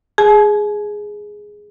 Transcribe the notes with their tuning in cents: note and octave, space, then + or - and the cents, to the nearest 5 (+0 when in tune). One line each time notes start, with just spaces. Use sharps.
G#4 +0 G#5 +45